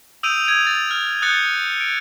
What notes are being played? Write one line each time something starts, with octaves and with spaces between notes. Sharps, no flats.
D#6 E6 G6 D7 D#7 F7
D#6 G#6 D7 F7
A6
F6
D#6 F#6 G6 A6 C#7
D7